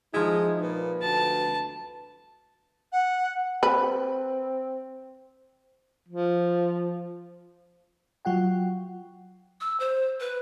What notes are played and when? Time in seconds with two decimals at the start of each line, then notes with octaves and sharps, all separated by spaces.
0.14 F3 G#3 D#4 E4
0.61 A#2 B4
1.02 D2 A5
2.92 F#5
3.63 C4 B4
6.08 F3
8.25 F#3 F4 F#5 G5
9.61 E6
9.80 C5
10.20 B4